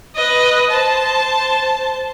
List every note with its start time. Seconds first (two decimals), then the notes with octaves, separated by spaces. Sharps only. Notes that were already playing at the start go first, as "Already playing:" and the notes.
0.15 B4 D#5
0.70 C5 A5